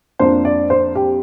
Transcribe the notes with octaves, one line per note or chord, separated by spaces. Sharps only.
F2 F3 A#3 D4 C5
D5
C5
G4